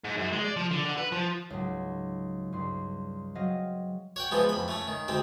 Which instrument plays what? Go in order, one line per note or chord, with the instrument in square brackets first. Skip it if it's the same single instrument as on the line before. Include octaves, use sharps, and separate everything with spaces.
[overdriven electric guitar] G#2
F#2
G#3
D5
F3
D3
D3
B4
F3
[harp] C#2 G#2 F#3
C#2 G2 C6
F#3 C4 D#5 F5
[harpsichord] C#5 F#5 G5
E3 F3 G#3 B3
F2 B5
A3 C#4
D#3
D2 G#3 C4